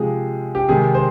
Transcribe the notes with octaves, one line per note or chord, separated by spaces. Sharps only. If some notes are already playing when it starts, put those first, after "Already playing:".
Already playing: C3 F3 G#3 G#4
G4
C3 D#3 G#3 G#4
C5